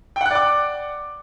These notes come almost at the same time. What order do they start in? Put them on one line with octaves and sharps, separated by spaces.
G5 F#5 F#6 D5 D6